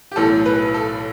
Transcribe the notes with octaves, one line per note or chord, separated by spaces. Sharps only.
G4
B1 A2 E3 A4
B4
A4